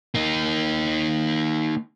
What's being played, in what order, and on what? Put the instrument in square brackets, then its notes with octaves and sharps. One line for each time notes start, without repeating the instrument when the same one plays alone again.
[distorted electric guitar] A#3 D#4